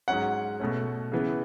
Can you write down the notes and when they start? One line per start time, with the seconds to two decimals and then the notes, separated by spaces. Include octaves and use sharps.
0.08 G#2 F#3 C#4 F#5
0.60 B2 A3 C#4
1.12 C#3 E3 B3